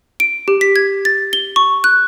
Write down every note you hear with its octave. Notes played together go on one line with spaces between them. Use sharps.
D7
G4
B6
G#6
A6
G7
C#6
F#6